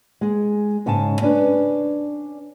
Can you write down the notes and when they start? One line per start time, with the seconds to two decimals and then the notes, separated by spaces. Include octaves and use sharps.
0.21 G#3 G#4
0.86 G#2 C#3 C#5 G#5 A5
1.22 C#4 D4 B4